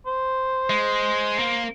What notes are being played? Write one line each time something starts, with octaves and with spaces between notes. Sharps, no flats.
C5
G#3
A#3